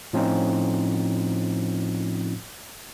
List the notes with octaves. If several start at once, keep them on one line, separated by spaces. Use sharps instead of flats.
A2 F3 C4 C#4 D#4 F4